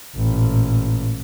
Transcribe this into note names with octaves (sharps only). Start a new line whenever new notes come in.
A1 A#2